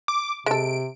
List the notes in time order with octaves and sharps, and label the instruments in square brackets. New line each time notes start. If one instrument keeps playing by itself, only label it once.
[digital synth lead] D6
[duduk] C3 [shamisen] G#3 A4 [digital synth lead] D7